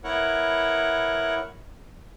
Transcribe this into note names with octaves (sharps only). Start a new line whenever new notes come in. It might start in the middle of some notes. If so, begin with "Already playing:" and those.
B3 E4 A#4 C#5 F#5